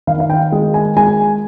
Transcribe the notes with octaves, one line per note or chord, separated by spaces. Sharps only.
D#3 F5
F5
G5
G#3
G#5
G#3 G#5